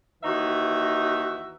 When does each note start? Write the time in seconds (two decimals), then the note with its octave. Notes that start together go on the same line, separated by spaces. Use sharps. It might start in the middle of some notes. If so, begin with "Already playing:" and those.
0.24 D#2 E3 D#4 F#4 E5